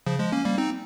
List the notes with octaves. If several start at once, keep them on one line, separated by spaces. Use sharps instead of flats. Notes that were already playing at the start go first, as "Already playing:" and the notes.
C#3 F3
F3 G#3
A#3 C#4
G3 A#3
C4 D#4